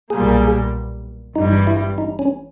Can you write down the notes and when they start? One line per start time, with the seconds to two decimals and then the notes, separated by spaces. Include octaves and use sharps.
0.10 B1 A#2 G3 A#3 G#4
1.35 G#1 G2 E3 G3 D#4
1.67 E4
1.98 D#4
2.19 C#4